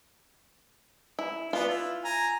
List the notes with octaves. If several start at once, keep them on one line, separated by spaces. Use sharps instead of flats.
E4
B3 D4 F4
E4
G#5 A#5